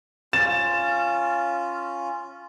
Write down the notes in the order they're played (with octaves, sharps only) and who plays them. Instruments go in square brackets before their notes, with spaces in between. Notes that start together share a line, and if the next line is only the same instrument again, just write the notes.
[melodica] C#4 F4 [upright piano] A6 E7